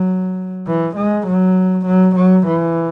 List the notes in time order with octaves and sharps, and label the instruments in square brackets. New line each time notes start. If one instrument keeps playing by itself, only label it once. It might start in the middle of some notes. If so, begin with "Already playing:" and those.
Already playing: [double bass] F#3
E3
G#3
F#3
F#3
F#3
E3